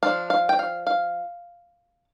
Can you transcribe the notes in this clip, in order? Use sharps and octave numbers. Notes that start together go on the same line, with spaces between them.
F3 D4 F5
F5
G5
F5
F5